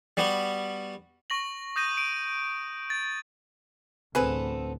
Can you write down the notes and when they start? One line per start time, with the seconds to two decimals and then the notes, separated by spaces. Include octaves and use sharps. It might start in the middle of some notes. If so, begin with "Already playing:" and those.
0.17 G3 B3 F#4 G4
1.30 C#6 A#6 F#7
1.76 D#6 G6 A#6 D#7
1.97 D7 D#7
2.90 A6
4.15 A1 D2 B3 C4 G#4 A4 B4